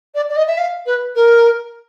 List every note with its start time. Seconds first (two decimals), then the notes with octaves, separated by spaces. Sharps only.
0.15 D5
0.29 D5
0.36 D#5
0.47 E5
0.57 F5
0.86 B4
1.15 A#4